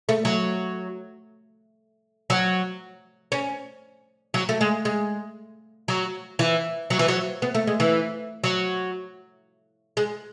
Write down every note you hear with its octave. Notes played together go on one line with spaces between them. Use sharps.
A3
F#3
F#3
C#4
F#3
A3
G#3
G#3
F#3
E3
F#3
E3
F#3
B3
A3
G#3
E3
F#3
G#3